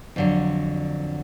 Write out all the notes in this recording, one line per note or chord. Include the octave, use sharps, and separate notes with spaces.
F2 D3 F#3